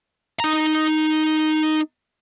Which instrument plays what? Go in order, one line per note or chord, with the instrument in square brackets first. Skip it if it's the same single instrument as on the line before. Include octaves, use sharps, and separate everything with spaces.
[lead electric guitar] D#4 A#5